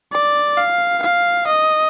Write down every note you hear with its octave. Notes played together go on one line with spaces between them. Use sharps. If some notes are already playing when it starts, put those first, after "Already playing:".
D5
F5
F5
D#5